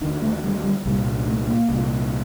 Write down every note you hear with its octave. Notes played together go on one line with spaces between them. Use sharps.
D#2 D3 D#3
A3
G3
G3
C2 A#2 G3
A3
A#3
C2 A#2